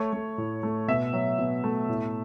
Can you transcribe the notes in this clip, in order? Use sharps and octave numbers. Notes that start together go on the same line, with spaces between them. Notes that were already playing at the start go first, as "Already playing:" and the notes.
Already playing: A3 C#5
A3
A2
A3
B2 E5
F#3
B2
A3
A2